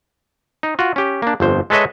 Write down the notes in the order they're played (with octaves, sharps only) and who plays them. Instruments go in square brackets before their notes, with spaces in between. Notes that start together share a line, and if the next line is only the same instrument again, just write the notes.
[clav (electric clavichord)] D#4
F4 F#4
C#4 G4
A#3 D4
G1 F2 C5
G#3 A4 B4 C#5 D#5 E5